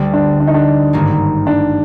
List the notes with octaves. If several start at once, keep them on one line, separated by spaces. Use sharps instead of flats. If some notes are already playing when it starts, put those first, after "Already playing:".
Already playing: D2 D3 G3
D4
D4
D#4
D4
G#1 G2 D#3 A#3 D#4
D4